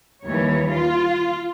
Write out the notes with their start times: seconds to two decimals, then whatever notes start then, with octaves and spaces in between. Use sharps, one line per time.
0.24 D#2 E3 G3 C#5
0.69 F4